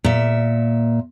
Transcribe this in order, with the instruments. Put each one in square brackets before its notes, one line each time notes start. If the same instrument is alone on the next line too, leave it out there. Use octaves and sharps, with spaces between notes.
[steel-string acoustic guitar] A#2 E5